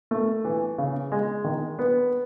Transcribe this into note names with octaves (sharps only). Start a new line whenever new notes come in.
A3
E3
C#3
G#3
D#3
B3